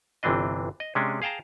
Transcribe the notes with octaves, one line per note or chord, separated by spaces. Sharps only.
G1 C3 E3 C4 D4 D#5
D#5
C3 G#3 C#4 D4
G#4 F5 G5 A5 A#5